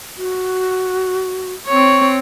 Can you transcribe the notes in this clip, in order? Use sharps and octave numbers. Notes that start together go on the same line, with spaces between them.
F#4
C4 C#5 C#6